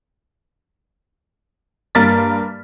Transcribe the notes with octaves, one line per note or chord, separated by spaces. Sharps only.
G2 A#3 A#4 F6 A6 B6